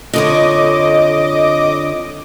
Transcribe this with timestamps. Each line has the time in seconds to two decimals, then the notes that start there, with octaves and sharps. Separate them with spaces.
0.13 F2 D3 C#5 D#5 D6